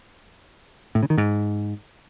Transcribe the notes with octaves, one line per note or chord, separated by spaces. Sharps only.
A2
C#3
D#3
G#2